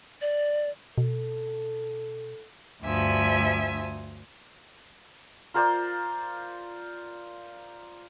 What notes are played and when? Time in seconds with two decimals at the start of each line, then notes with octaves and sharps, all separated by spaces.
0.21 D5
0.98 B2 A4
2.83 D2 G2 F3 E5 G#5
5.54 F4 A#4 C5 D5